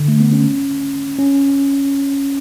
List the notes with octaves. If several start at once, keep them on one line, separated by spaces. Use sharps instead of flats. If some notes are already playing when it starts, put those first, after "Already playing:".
Already playing: D3
A3
B3
C#4
C#4